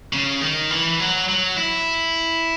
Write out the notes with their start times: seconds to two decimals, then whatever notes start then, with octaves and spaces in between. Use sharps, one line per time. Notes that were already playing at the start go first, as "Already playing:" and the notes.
0.13 C#3
0.42 D#3
0.71 E3
1.00 F#3
1.29 F#3
1.57 E4